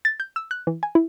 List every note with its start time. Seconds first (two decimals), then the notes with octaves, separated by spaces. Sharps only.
0.05 A6
0.20 G6
0.36 E6
0.51 F#6
0.67 E3
0.83 G#5
0.95 E4